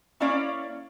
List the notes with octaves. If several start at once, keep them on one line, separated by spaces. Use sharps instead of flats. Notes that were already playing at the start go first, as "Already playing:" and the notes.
A#3 C#4 E4 C#5 D5 F5